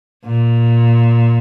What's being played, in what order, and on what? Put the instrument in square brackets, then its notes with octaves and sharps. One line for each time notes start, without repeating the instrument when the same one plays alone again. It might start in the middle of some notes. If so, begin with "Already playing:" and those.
[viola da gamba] A#2